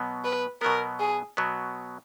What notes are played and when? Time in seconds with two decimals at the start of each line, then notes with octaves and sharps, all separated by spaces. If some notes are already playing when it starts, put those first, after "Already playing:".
Already playing: B2 F#3 B3
0.25 B4
0.61 B2 F#3 B3 A#4
1.00 G#4
1.37 B2 F#3 B3